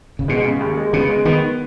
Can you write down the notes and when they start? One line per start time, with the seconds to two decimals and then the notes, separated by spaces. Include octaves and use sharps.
0.19 C#3
0.28 B2 G#3
0.46 C#3
0.61 D#2
0.77 G#3
0.93 C#3 B3
1.09 G#3
1.25 D#3 B3